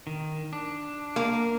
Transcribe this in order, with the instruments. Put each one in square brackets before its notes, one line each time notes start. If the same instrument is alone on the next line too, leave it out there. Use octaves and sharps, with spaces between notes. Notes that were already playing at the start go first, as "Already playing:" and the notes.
[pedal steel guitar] D#3
D4
[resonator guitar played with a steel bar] A#3